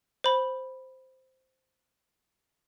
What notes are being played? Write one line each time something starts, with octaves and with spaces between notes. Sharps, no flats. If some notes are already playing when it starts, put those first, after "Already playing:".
C5 B5